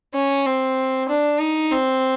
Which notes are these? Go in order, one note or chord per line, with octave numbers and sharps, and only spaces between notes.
C#4
C4
D4
D#4
C4